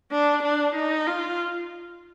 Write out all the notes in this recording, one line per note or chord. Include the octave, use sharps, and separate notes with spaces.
D4
D4
D#4
F4